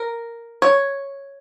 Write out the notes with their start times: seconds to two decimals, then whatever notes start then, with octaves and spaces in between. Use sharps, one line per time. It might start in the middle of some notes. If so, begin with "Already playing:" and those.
Already playing: A#4
0.62 C#5